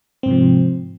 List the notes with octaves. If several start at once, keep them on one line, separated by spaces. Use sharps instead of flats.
G#2 C3 F3 C4